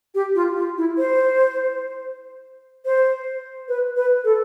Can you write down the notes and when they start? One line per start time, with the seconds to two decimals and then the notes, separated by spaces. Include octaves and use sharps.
0.15 G4
0.35 F4
0.57 F4
0.77 E4
0.98 C5
2.85 C5
3.68 B4
3.96 B4
4.24 A4